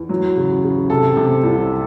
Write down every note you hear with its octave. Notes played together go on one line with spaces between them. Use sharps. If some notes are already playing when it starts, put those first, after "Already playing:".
Already playing: E2
F#3
C#3
C#3
C3 A4
C3
C2